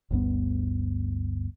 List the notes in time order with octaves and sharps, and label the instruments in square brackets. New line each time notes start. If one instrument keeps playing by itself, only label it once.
[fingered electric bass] G1 D2 G2 B3